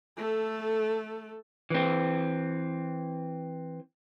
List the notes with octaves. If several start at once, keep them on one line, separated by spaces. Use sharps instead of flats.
A3 A4
E3 C4